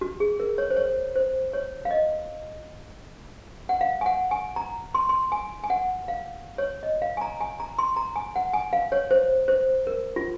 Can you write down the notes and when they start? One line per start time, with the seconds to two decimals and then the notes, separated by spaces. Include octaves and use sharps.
0.01 F#4
0.20 G#4
0.40 A#4
0.58 C#5
0.70 C5
0.76 C#5
1.16 C5
1.53 C#5
1.85 F5
1.91 D#5
3.69 F#5
3.81 F5
4.01 G#5
4.06 F#5
4.31 G#5
4.56 A#5
4.95 C6
5.09 C6
5.32 G#5
5.64 G#5
5.70 F#5
6.08 F5
6.58 C#5
6.83 D#5
7.02 F5
7.17 G#5
7.21 A#5
7.41 G#5
7.60 A#5
7.79 C6
7.96 A#5
8.16 G#5
8.36 F#5
8.54 G#5
8.73 F5
8.92 C#5
9.11 C5
9.48 C5
9.87 A#4
10.16 F4